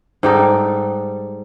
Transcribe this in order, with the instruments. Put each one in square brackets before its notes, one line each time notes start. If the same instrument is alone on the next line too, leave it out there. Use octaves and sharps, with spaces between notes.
[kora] G#2 G3 D#4 A4